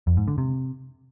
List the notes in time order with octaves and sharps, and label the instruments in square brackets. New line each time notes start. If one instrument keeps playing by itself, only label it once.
[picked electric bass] F2
G#2
D3
C3